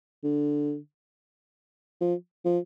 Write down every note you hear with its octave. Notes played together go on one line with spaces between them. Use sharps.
D3
F3
F3